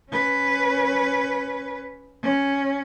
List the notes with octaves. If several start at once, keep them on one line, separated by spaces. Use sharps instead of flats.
C#4 B4
C#4